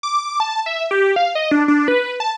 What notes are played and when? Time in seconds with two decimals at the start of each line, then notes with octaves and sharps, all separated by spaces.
0.03 D6
0.40 A5
0.66 E5
0.91 G4
1.16 F5
1.35 D#5
1.51 D4
1.68 D4
1.88 B4
2.20 A5